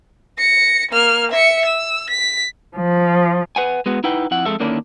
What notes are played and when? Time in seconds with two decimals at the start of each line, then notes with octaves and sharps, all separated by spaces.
0.38 A#6 C#7
0.91 A#3 F6
1.32 E5 C#7
1.66 E6
2.10 B6
2.76 F3
3.56 B4 F#5 G#5
3.86 G#3 B3 F#4
4.04 D#4 E4 B4 F#5 G5
4.31 F2 E4 F#5
4.45 F2 D#3 G#3 A4 E5
4.60 D3 D#3 A#3 C#4 D4 E4